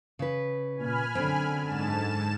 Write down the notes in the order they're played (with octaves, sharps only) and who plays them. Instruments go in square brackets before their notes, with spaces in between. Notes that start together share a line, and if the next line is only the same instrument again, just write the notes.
[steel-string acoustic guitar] C#3 B4
[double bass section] A#2 [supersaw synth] G#5 B5 F6
[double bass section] F#2 D3 [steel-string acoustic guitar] C4
[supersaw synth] G#2 A5 E7